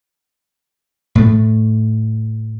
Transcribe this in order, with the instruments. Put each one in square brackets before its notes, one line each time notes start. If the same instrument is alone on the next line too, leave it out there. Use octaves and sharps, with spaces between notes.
[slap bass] A2 A3